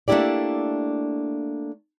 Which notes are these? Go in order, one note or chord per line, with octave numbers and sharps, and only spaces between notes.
A3 A#3 D4 E4 G4 D5